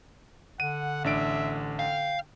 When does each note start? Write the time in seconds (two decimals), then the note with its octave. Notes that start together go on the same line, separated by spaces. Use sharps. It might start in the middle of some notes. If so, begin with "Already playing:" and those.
0.60 D3 F#5 D#7
1.04 A1 D4 E5 D7
1.79 F5 G5